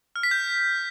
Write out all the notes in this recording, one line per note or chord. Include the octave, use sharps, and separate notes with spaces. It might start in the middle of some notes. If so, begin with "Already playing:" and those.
F6
B6
G6